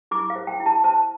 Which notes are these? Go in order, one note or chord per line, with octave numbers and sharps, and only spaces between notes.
E4 D6
F5
C5
G5
E4
A5
C5 A5